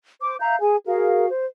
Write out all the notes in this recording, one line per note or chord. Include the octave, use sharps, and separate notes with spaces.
C5 D6
E5 F5 A#5 G6
G#4 G#5
F#4 G#4 A#4 F5
C5